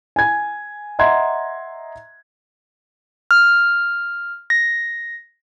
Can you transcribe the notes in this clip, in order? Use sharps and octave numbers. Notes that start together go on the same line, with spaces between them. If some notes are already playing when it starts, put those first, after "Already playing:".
G#5 G#6
D#5 E5 F#5 A#5 C6 G#6
F6
A#6